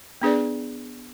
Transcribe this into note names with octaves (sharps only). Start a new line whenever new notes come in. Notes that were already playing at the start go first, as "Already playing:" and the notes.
B3 D4 G#4 B4 D5